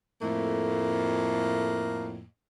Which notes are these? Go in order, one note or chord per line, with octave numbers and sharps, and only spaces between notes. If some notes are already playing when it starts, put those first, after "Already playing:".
F2 A2 A3 A#3